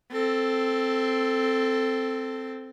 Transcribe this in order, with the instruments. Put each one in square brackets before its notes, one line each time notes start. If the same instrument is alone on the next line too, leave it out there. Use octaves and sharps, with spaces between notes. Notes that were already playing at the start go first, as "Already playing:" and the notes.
[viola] C4 A4